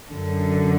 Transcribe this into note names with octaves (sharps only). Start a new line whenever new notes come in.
F#2 D3